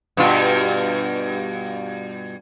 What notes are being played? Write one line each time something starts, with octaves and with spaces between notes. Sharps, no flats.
G2 B2 F4